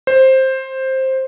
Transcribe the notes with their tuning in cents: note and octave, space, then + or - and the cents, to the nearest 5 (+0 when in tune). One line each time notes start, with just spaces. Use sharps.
C5 +10